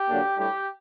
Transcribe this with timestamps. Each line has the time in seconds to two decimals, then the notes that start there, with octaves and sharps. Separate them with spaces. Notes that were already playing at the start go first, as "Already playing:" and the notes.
Already playing: G4
0.09 D3 F#3 A#3 D4
0.36 A2 G3 D4 G4